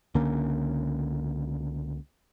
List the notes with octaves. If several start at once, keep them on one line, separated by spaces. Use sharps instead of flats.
C#2 D3 A#3 C#4